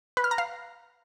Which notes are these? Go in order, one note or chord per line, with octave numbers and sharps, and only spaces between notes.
B4
F6
A#5
F5